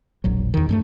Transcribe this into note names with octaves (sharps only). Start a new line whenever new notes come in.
E1 A#1 F#3
E2 D#3
G2 G#3 A3